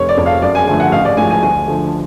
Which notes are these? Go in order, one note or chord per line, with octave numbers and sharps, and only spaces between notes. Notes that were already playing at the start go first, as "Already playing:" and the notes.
Already playing: F1 C#5
D5
F2 F3
F5
F#2 D5
G#5
D3 F3 A3 G#5
F#5
A1 F5
D5
A2 F3 G#3 G#5
G#5
D2 G#5
D3 F3 A3